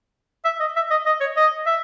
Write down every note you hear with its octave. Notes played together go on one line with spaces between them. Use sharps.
E5
D#5
E5
D#5
D#5
C#5
D#5
E5